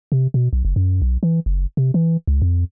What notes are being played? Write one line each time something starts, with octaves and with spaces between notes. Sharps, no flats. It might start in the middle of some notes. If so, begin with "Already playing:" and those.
C3
B2
B1
F#1
F#2
B1
E3
F#1
C3
E3
C#2
F2